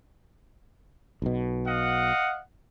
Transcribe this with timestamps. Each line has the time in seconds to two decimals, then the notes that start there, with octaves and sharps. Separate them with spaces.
1.22 B1 B2
1.66 D#5 F5 F#5